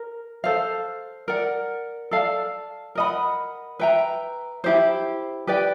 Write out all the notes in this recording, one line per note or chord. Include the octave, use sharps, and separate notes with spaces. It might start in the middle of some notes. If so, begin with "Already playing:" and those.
Already playing: A#4
A4 C5 F5
A#4 D5 F#5
A4 D5 F5 A5
A#4 D#5 F#5 B5
B4 E5 G5 A#5
E4 G4 C5
G4 B4 D5 G5